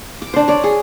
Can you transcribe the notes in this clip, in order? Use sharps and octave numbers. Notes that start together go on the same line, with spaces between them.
D6
D4 C5
C#5 D5
G#4